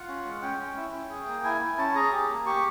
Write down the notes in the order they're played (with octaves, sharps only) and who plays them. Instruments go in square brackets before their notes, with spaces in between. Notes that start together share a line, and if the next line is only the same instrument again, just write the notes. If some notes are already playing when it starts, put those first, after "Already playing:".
Already playing: [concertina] F4 F#5
C#4
G#3
C#4 G5
C#4
E4
C#4
G#4
A#3
E4 G#5
E4
C#4 A5
G#4 A#5
G4
A#3
G4 C#6